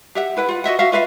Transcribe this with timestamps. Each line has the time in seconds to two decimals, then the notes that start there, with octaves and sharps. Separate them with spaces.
0.15 G4 E5 F#5
0.37 E4 B4 F#5
0.48 F4 F#5
0.64 F#4 D#5 E5 F#5
0.79 F#4 E5 F5
0.92 F4 B4 E5 F5